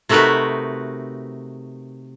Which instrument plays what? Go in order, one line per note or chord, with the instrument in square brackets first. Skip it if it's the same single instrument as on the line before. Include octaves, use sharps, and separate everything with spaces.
[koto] C3 A3 D#4 F#4 A#4 B4